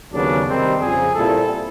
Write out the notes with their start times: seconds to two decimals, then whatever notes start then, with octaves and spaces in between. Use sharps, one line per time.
0.12 D#2 C#3 F#3 B3 D4
0.46 C3 D#3 G3 C4 D#4
0.80 F2 C#3 F3 G#4
1.15 A#2 G3 C4 E4 A4